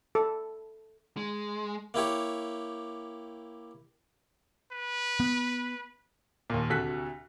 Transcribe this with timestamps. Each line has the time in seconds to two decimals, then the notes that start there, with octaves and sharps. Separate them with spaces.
0.15 A4
1.17 G#3
1.94 A#3 E4 G4 C#5
4.72 B4
5.20 B3
6.50 D#2 A#2
6.70 D2 C3 F#4 A4 F#6 B6